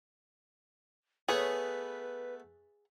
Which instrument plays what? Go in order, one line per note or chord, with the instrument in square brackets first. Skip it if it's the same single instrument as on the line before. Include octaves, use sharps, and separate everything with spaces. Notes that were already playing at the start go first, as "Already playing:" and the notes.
[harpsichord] A3 B3 [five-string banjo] G#4 C#5 [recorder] B4